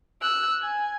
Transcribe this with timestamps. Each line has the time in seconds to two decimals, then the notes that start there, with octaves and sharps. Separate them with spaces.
0.22 E6 F#6
0.61 G#5